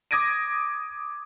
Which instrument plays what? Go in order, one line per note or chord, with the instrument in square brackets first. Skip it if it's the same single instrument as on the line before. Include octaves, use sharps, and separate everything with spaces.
[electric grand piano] D6 D#6 G#6 A#6 D7 D#7